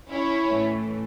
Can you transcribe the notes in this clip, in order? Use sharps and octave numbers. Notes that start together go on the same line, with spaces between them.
C#4 E4
A2 E3 A3